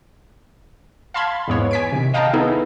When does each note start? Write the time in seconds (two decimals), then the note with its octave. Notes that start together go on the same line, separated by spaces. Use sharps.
1.14 F5 A5 B5 C6 G#6
1.48 E2 G#2 B3 C#5
1.71 G#5 B6 D7
1.92 C3 D#3
2.14 D#5 F5 G5 A5 A#5
2.34 B3 D#4 E4 G#4 A4